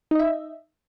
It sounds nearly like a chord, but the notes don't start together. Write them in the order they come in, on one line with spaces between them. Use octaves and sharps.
D#4 D#5 E5